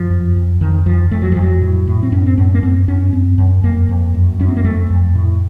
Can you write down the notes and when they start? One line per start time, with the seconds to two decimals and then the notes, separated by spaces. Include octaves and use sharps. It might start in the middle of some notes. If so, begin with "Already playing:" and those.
Already playing: F#2 F3
0.10 F2
0.36 F2
0.61 F2 D#3
0.86 F2 F3
1.11 F2 A3
1.22 F#3
1.32 F2 F3
1.42 F#3
1.61 A2
1.87 A2
2.03 C4
2.12 F#2 C#4
2.26 C4
2.38 F#2 C#4
2.54 A#3
2.63 F#2 C4
2.88 F#2 C#4
3.13 F#2 C4
3.38 F#2
3.64 F2 A#3
3.89 F2
4.14 F#2
4.39 F#2 C#4
4.48 C4
4.57 A#3
4.64 F2 A3
4.90 F2
5.15 A2